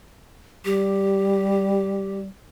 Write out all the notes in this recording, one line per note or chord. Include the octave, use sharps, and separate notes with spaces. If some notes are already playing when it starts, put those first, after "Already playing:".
G3 G4